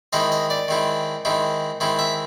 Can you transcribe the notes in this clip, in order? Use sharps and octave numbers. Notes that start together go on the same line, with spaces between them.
D#3 G#3 C4 E4 D#5
D#5
D5
D#3 G#3 C4 E4
D#3 G#3 C4 E4
D#3 G#3 C4 E4
E5